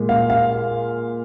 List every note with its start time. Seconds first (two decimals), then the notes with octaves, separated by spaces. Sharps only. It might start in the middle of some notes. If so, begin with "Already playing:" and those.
Already playing: A#2 G#3
0.09 F5
0.30 F5